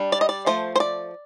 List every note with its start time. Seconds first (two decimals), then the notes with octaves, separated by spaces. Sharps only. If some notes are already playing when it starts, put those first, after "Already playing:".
Already playing: G3 D4
0.12 D5
0.21 D#5
0.29 D5
0.46 F3 A3 C5
0.76 C5
0.80 D5